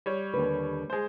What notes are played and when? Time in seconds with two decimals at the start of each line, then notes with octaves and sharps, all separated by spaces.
0.06 G3 C#5
0.34 D#2 D3 B4
0.90 G#3 C5